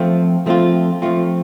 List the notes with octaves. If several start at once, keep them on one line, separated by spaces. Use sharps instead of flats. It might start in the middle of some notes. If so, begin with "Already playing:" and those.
Already playing: F3 A3 C4 F4
F3 A3 C4 F4
F3 A3 C4 F4